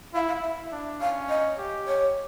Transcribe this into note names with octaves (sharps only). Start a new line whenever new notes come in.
E4 F5
F5
E5
D4
C#4 F5
D#5
G4
C#5